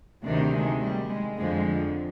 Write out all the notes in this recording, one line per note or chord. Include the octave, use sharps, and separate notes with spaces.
D2 C3 D#3 D4
G#3
G3
G#3
F2 D3 F3 G#3